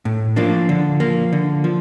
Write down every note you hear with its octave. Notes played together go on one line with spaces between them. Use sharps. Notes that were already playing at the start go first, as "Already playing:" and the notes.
A2
F3 A#3 D4
D3
F3 A#3
D3
F3